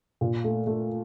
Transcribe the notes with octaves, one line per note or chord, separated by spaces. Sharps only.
A#2
A3
A3